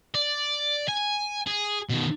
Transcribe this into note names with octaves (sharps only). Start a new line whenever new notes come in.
D5
G#5
G#4
B2 D#3